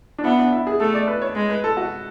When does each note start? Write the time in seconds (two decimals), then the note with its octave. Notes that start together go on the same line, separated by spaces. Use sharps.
0.18 D4
0.24 B3 E4
0.39 D4
0.52 E4
0.67 G#4
0.80 A3 A4
0.94 D5
1.07 B4
1.22 C#5
1.35 G#3
1.50 B4
1.64 A4
1.77 F#4